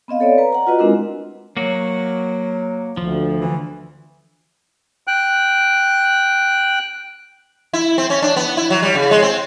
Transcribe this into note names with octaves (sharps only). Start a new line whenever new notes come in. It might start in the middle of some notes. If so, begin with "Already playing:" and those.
B3 C4 D#5 F5
A4 C#5 D5
B4 A#5
F#5 A#5
F4 F#4 B4 D#5
G#3 C4 D4 E4 A#4
F#3 A#3 F#4
D2 F3
E3
G5 F#6
E4
C4
C#4
D4
B3
E4
F#3
G3
C#3
G#3
C4